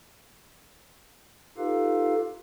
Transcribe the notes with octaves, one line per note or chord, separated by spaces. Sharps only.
D#4 F4 G4 A4 B4 F5